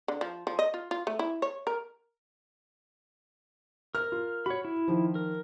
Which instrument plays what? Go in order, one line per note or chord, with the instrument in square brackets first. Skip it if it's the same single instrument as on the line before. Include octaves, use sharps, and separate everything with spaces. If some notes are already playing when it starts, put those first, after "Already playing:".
[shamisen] D3
F3
F3
D#5
F4
F4
A3
E4
C#5
A#4
[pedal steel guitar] A#4 [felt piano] F6
[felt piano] F4
[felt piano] F#4 [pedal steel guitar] C#5 B5
[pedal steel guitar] E4
[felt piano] D#3 F3
[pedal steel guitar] A#4